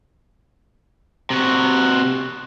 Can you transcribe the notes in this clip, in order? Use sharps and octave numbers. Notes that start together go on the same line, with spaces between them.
C3 F#4